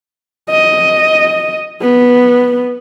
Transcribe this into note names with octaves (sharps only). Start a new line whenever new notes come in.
D#5
B3